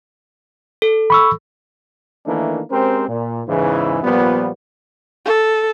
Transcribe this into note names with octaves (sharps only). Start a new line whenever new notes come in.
A4
B5 C#6 E6
D#3 E3 A3 A#3 D4 D#4
G#3 C4 C#4 G4 A#4 C5
A#2
E2 G#2 C#3 E3
A#2 F3 G3 B3
A4